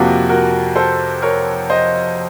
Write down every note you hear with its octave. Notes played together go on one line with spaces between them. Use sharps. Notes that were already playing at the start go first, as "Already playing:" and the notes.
Already playing: F2 C3 F3 A#3 F#4 A#4
F#4 A#4
A4 C5
A#4 C#5
C5 D#5